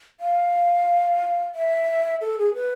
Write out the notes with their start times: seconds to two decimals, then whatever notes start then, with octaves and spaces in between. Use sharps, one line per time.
0.20 F5
1.55 E5
2.21 A4
2.39 G#4
2.55 B4